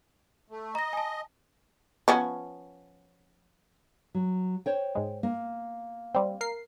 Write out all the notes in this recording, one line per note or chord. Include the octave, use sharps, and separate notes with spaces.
A3
D#5 A#5 A#6
G#5 A5
F3 B3 C#4
F#3
C5 C#5 G5
G#2 G#3
A#3
G3 C4
A#4 C7